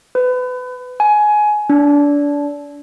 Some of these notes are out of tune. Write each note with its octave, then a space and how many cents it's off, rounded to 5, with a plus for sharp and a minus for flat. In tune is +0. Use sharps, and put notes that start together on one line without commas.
B4 +30
G#5 +20
D4 -25